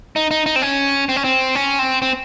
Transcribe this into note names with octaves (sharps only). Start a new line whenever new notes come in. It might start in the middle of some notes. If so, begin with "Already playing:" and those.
D#4
D#4
D#4
C4
C#4
C4
C#4
C4
C#4
C4
C4